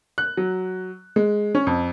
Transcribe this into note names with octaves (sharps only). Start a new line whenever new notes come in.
F#6
F#3
G#3
C#4
F2